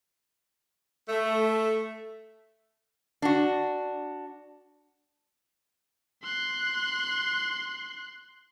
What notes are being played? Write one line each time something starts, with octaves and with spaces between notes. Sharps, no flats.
A3
D4 F#4
C6 F#6